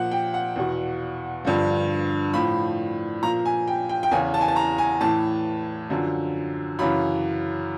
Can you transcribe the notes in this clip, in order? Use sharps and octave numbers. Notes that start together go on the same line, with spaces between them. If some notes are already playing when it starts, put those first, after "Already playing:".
Already playing: A#2 F3 F#5
G5
F#5
E2 B2
G2 D3 F3
A2 F3 B5
A#2 F3 A#5
G#5
G5
G5
G5
E2 C#3 E3 G#5
A5
G#5
A5
A#5
G#5
A2 E3 A5
F#2 D3 F3
F#2 C#3 E3 B5